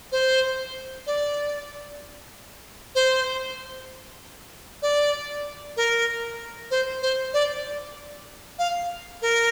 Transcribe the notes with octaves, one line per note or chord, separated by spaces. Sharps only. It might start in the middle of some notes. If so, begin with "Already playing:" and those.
C5
D5
C5
D5
A#4
C5
C5
D5
F5
A#4